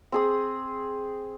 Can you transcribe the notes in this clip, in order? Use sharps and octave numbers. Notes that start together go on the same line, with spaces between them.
C4 G#4 D#6